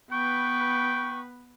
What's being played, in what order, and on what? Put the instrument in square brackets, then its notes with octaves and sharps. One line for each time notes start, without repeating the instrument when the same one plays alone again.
[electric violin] B3 B4 [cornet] G5 [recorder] C#6